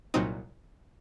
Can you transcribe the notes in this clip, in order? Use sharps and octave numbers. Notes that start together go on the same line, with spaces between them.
C2 A#2 F#3 C4 D#4 D#6